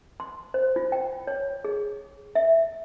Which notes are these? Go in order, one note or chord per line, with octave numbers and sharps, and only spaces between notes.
C6
C5
F4
G5
C#5
G#4
E5